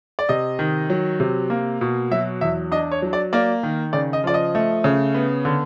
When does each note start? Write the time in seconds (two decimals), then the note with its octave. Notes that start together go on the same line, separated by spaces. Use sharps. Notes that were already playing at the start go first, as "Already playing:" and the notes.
0.19 D5
0.29 C3 D#5
0.59 D#3
0.90 F#3
1.20 C3
1.50 A#3
1.81 B2
2.11 F#3 E5
2.41 E2 E5
2.72 D4 D#5
2.91 C#5
3.02 F#3
3.13 D5
3.33 A#3 D5
3.63 D#3
3.93 C#3 D5
4.13 D#5
4.24 F3 D5
4.34 D#5
4.55 A3
4.84 C#3
5.14 B3
5.45 D3